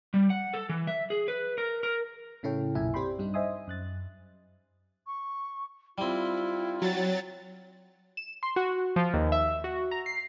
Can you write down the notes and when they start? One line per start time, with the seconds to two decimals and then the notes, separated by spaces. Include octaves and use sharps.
0.14 G3
0.30 F#5
0.54 A4
0.69 E3
0.87 E5
1.10 G#4
1.28 B4
1.58 A#4
1.83 A#4
2.43 A2 C#3 E4 A4 C#5 G5
2.75 B1 F#2 A#2 E4 E5 G#5
2.94 C4 G4 D5 G5 B5 C6
3.19 G2 G3 D4 D#4
3.34 C5 D#5 E5 G#5 C6 D#6
3.68 F#2 F#6 A6
5.07 C#6
5.98 G3 C4 E4 F4
6.82 F#3 A6
8.17 E7
8.43 C6
8.56 F#4
8.96 F3
9.14 D#2
9.32 E5
9.64 F#4
9.91 A#5
10.06 C7